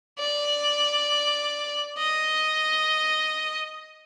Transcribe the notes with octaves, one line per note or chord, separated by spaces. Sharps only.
D5
D#5